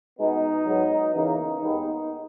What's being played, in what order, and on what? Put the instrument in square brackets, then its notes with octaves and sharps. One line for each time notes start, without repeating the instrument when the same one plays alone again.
[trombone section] B2 G#3 B3 D#4
G#2 F#3 B3
E2 C#3 E3 A#3 D#4
D#2 D#3 G#3 B3